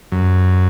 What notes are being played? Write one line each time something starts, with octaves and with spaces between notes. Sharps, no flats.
F#2